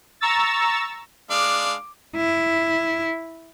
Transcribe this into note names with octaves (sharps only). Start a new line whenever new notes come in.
A#5 C#6 E6 A6
G#3 D4 F5 D6
E4